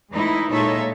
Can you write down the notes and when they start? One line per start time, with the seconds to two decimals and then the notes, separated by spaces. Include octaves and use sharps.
0.12 E3 G#3 A3 D#4 E4
0.51 A#2 G#3 D#4 A4 C#5 E5